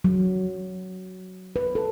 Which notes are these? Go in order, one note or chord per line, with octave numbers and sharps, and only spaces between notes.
F#3
B4
A4